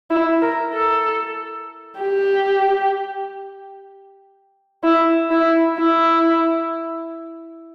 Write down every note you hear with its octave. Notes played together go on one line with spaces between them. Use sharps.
E4
A#4
A4
G4
E4
E4
E4